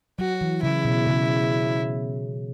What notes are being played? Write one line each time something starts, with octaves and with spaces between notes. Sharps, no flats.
F#3 F#4
E3
C#3 E4
B2
C#3